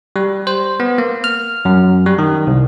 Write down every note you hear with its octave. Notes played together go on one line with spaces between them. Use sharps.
G3
C5
B3
A#3
F6
F#2
G3
D#3
C2